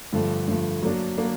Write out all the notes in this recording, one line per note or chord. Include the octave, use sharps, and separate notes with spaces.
G2 D3 F3 A3
G2 D3 F3 A3
F#3 A#3 D4
F#3 A#3 D4